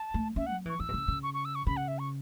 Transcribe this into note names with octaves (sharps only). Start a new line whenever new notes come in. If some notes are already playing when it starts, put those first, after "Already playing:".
Already playing: A5
A3
C#4 E5
F#3 F#5
E3 C#6
E3 E6
B2
C#3
C#3
C#6
C#6
E6
C#6
C#3 B5
F#5
E5
C#6